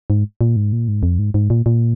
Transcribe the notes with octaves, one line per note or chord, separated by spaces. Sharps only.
G#2
A#2
G#2
A#2
G#2
F2
G#2
G#2
A#2
A#2